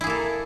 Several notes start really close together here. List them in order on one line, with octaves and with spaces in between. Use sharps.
E4 G#4 A#3 A4